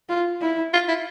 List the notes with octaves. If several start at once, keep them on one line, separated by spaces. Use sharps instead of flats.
F4
E4
F4
E4